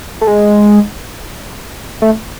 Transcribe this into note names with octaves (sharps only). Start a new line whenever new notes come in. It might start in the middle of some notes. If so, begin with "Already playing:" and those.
A3
G#3
A3